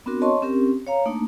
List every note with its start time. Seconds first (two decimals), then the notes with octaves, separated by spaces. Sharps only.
0.06 B3 C4 D4 F#4 A#4
0.21 C#5 D#5 A5 C6 C#6
0.42 C4 C#4 G4 A#4
0.87 C#5 F5 A#5
1.05 A3 A#3 D4 D#4